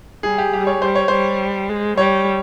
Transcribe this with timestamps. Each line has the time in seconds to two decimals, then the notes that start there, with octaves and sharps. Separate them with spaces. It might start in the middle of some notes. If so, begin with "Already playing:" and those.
0.23 G3 G#4
0.38 G4
0.53 G3 G4
0.67 C#5
0.82 G3 C5
0.95 C#5
1.08 G3 C5
1.69 G#3
1.98 G3 C#5